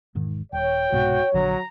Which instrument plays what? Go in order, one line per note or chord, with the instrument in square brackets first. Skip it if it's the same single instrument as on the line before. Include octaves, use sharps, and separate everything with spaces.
[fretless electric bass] E1 G#2 D#3
[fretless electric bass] D#1 [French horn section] C#5 [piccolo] G5
[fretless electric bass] C2 G#2 B2 [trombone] F#4
[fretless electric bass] A#1 D3 [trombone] F#3 [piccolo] A#5